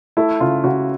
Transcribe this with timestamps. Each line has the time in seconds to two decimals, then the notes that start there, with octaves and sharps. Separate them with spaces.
0.17 A3 E4
0.40 C#3 F4
0.64 C#3 F#4